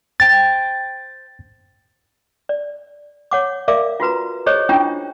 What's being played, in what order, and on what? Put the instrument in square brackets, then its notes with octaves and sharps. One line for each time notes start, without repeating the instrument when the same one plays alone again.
[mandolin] C5 G5 A5 [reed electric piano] A6
[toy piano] D5
C#5 F#5 D6
A#4 D5 E5 F5 D6
F4 F#4 B4 A#5
G4 G#4 C5 C#5 D#5
C#4 D4 E4 F4 G4 G5